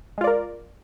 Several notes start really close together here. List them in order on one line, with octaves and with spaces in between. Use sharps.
G#3 F4 D5 A#4